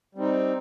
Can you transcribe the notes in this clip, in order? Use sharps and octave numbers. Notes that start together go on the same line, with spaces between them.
G3 C4 D#4